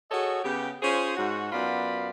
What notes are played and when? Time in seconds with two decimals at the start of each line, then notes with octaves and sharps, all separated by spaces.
0.11 F#4 G#4 A4 C#5 D#5
0.44 C#3 B3 G4
0.83 C#4 F4 G#4 C5
1.17 G#2 F#4
1.52 F#2 B3 F4 D5 B5